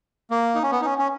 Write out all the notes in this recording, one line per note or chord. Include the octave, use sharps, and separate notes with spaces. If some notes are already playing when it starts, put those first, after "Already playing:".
A#3
D#4
C#4
B3
D#4
C#4
C#4